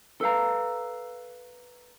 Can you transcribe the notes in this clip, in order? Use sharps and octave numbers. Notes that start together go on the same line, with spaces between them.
A4 B4 F5 A#5